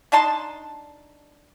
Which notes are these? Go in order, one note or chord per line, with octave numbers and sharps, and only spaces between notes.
D4 D#4 A5 C6